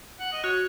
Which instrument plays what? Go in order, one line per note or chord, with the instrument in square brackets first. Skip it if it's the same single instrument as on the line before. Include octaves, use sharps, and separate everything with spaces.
[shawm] F#5
D#5
[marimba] F#4 [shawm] C#5